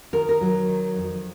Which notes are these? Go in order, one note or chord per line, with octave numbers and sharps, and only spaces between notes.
D#3 A#4
A#4
F#3
D#3
F2